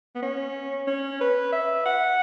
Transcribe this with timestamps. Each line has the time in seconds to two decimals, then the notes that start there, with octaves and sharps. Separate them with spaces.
0.15 B3
0.22 C#4
0.87 C#4
1.21 B4
1.52 E5
1.86 F#5